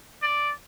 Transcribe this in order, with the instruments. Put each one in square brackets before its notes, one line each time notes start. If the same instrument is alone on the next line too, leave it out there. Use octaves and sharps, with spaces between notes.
[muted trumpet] D5